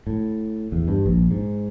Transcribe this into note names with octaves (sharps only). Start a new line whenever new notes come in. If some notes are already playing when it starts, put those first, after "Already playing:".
A2
E2
G2
A#1
G#2